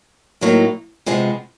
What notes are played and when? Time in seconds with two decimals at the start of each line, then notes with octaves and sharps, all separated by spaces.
0.41 A2 F#3 A#3 D#4
1.06 C3 F3 G#3 B3